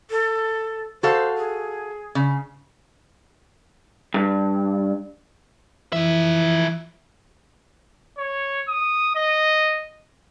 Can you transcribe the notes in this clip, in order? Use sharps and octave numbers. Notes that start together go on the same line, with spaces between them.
A4
F#4 A4 C5 F5
G#4
C#3
G2
E3 F3 E5
C#5
D#6
D#5